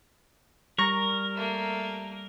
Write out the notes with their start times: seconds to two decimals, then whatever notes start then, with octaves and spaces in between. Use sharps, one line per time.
0.79 G3 A#4 A#5 C#6 A#6
1.35 A3 A#3